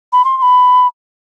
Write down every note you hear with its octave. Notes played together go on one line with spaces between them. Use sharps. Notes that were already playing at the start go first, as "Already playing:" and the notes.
B5
C6
C6
B5